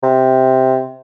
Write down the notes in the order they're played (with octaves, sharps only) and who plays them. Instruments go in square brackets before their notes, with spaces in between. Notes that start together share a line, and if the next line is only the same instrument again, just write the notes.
[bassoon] C3